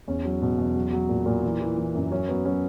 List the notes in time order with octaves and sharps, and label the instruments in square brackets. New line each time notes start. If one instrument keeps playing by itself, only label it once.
[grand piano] E2 C#4
F#3
B2
E2
F#3
F#3
A#2
A#2
E3
E3
E3
F#2
F#3 C#4
F#3 B3
F#3 C#4